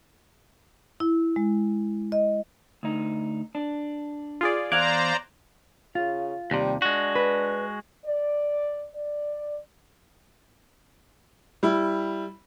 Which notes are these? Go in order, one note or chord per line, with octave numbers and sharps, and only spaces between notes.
E4
G#3
D#5
D2 D#4
D4
F4 G#4 D5
E2 C5 D5 F5 A#5 D6 F#6 G#6
C#3 F4
D#2 C3 G3
G#3 D4 F#4
B4
D5
D5
G3 E4